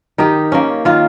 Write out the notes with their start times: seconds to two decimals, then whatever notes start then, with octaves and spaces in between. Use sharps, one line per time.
0.18 D#3 D#4 G4
0.52 A#3 C#4
0.85 D#3 F4